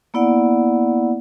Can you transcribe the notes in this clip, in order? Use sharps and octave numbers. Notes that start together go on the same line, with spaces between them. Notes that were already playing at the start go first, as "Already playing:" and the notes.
A#3 B3 E4 D5 F#5